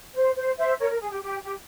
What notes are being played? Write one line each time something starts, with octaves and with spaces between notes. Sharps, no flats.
C5
C5
C5 E5
A#4 C#5
A#4
G#4
G4
G4
G4